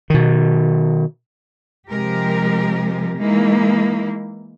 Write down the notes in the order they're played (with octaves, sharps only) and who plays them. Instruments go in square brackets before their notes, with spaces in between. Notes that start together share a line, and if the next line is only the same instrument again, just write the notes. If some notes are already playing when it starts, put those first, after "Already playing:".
[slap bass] B2 D#3
[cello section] C3 F3 G#3 G4 A#4
E3 G#3 A#3 D#4 E4